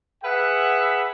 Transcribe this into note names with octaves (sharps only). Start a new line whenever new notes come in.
G#4 B4 E5 F#5